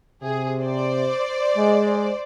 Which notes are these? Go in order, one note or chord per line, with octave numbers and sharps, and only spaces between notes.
C3 G#4
C5 D5
G#3